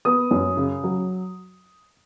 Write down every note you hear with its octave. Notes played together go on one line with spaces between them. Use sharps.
B3 D#6
F#2
C#3
F#3